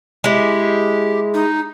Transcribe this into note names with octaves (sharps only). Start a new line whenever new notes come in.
G#3 E4 G4
D#4